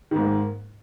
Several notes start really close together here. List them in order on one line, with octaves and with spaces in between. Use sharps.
D#3 G#2 A#3